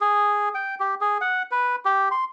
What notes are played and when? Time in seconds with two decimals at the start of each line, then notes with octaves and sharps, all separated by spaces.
0.01 G#4
0.54 G5
0.80 G4
1.01 G#4
1.21 F#5
1.51 B4
1.85 G4
2.11 C6